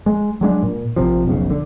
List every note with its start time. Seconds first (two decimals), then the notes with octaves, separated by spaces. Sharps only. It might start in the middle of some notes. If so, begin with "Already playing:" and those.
0.06 G#3
0.41 F#3 G#3 D4
0.63 A#2
0.96 A#1 C3 F3
1.26 F1 B1 C#3
1.50 D3